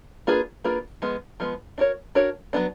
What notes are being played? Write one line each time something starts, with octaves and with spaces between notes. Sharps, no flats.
A#3 D4 F4 G#4 B4
A#3 D4 F4 G#4 B4
F3 G#3 B3
F3 G#3 B3
D4 F#4 A#4 C#5
D4 F#4 A#4 C#5
F#3 B3 D4